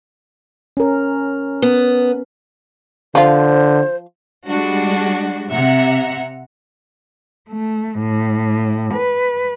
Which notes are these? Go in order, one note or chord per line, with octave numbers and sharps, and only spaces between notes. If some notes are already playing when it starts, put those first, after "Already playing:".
C#4 A#4
B3
D3 F3 F4 C5
G3 G#3 D4 F#4
C3 E5 F#5 A#5
A3
A2
B4